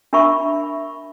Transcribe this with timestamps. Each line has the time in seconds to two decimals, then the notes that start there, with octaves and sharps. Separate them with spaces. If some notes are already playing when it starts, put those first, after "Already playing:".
0.13 D4 A#4 E5 B5 C#6